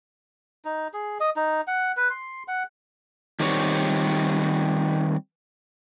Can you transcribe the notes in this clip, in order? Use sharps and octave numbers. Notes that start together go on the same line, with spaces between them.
D#4
G#4
D#5
D#4
F#5
B4
C6
F#5
D#3 G3 C4 C#5